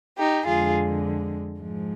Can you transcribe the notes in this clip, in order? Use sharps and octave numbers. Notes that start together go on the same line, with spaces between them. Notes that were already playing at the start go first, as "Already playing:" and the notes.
D#4 G4
F2 D3 G#3 F4 G#4
G#2 F3 G#3